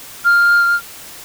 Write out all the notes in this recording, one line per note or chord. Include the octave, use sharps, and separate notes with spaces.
F6